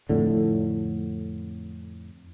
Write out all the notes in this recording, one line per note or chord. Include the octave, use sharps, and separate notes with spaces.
F2 A2 D3